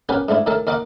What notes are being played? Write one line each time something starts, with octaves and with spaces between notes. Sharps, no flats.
B3 C#4 F#4 G4 A#4 B4
G#2 A3 D4 E4
A2 D#3 A4 A#4 A5
D#2 A#4 D#5 F#5 D6